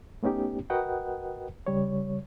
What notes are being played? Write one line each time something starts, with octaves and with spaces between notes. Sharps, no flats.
A3 B3 C#4 D#4 G4
F#4 A#4 B4 D#5 F#5 G5
C#3 G3 C#5